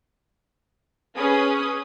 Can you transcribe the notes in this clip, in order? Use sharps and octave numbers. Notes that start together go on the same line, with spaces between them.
C#4 G#4 B4 D#6